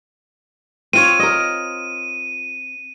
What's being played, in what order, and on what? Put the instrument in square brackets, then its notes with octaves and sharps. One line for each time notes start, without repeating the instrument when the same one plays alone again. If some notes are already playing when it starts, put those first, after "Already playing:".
[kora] C4 F4 C#5 [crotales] D#7
[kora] A#4 D#5